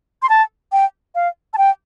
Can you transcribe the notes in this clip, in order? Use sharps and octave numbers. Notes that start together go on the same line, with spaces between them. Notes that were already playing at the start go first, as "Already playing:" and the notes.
C6
A5
G5
F5
A5
G5